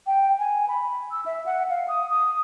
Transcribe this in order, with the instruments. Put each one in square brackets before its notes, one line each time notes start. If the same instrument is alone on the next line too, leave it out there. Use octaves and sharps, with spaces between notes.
[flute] G5
G#5
B5
E6
E5
F#5
F5
D#6
D#6